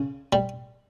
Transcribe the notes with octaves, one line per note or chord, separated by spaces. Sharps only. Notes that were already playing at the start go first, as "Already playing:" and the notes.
Already playing: C#3
G3